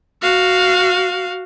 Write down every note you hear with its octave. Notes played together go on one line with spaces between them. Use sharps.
F#4 F5